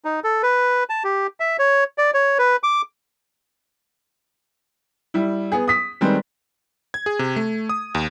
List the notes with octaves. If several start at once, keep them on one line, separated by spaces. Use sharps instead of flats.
D#4
A4
B4
A5
G4
E5
C#5
D5
C#5
B4
D6
G3 E4
B3 G#4
D#6 B6
D#3 G3 G#3 C4 B4
G#6
G#4
C3
A3
D#6
D#2